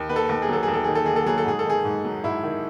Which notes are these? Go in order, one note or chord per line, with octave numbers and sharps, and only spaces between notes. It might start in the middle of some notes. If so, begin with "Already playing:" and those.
Already playing: D#2
D#3 B4
A4
D#2
G#4
F#3 A4
G#4
D#2
A4
D#3 G#4
A4
D#2 G#4
A4
F#3 G#4
A4
G#2 G#4
A4
D#3 G#4
G#2
F#3
G#2 E4
D#3